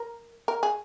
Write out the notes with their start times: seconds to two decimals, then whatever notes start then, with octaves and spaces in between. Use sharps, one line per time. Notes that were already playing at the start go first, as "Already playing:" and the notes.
Already playing: A#4
0.48 A#4
0.63 G#4